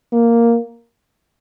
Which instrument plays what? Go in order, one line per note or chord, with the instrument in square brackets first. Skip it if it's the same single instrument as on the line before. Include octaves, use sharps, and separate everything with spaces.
[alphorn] A#3